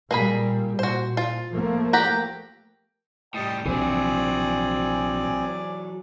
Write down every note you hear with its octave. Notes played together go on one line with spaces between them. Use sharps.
A#2 G3 A#3 G#4 B5
A#2 F#4 C5
F4
F3 A3 A#3
G4 F#5 A#5
A2 G3 D#5 G5 A5
A#1 C3 E3 F#3 C4 G#4 D5 G#5